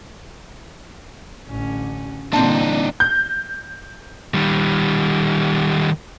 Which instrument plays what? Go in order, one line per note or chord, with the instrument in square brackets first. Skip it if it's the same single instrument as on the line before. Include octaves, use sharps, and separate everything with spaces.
[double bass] A1 D3 [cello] C#4
[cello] A#2 G3 [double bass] D3 E3 [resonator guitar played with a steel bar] C4 A5 [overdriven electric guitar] D4 D#4
[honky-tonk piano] G6
[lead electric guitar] D#3 G3